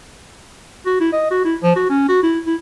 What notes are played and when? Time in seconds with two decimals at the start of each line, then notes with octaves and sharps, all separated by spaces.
0.86 F#4
1.00 E4
1.12 D#5
1.31 F#4
1.45 E4
1.63 F3
1.76 F#4
1.90 C#4
2.08 F#4
2.23 E4
2.47 E4